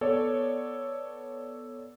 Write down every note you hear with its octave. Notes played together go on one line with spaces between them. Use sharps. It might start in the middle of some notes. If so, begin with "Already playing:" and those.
B3 A4 C#5 D5